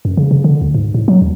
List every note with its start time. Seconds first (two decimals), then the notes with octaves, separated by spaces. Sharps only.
0.05 F#2
0.17 C#3
0.31 C#3
0.44 D3
0.61 D2
0.75 G#2
0.94 A2
1.08 F#3
1.22 D#2